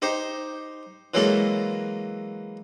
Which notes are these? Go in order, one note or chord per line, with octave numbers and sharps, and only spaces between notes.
D#4 G4 C5
E3 F#3 G#3 A#3 E4 A4